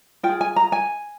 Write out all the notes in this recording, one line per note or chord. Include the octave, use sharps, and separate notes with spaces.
F4 G5
G#4
G#5
A#5
G#5